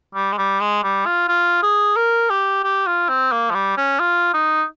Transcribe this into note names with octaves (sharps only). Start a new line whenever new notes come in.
G3
G#3
G3
G#3
G3
F4
F4
G#4
A#4
G4
G4
F4
C4
A#3
F3
G3
C#4
F4
D#4